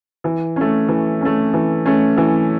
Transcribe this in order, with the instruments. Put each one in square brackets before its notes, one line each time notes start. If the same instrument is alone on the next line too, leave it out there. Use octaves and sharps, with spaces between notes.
[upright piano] E3
A3 C#4
E3
A3 C#4
E3
A3 C#4
E3